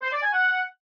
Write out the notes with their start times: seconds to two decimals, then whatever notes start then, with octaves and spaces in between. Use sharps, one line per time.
0.02 C5
0.12 D5
0.23 G#5
0.33 F#5